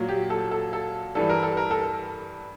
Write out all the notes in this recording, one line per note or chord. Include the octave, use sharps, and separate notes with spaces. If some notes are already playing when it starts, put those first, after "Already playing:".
Already playing: A#2 F#3
G4
A4
A4
A4
G2 E3 G3 A4
A#4
A4
A#4
A4